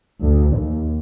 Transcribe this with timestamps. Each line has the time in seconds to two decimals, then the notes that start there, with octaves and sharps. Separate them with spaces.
0.20 D2
0.54 D#2